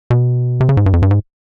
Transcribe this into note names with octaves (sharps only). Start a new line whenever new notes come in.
B2
C3
C#3
G#2
G2
F2
G2
G#2